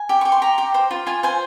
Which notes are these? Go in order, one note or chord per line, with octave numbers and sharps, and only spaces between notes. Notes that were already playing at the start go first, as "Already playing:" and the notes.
Already playing: G#5
G4
G4 C#6
C6
G4 A#5
G4
C5
F4
F4 G#5
C5 G#5